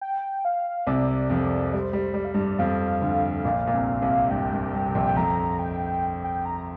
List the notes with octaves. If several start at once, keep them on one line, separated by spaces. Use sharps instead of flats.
G5
F5
C2 C3 D5
F2 F3
G3 C5
G3
G3 D5
F5
G2 G3 D5
F2 F3 F5
D2 D3
A#1 A#2
A#2
C2 C3
C2 C3
G2 G5
G2
G2
C3
A#1 A#2
G5
F2 A#5
G5
G5
A#5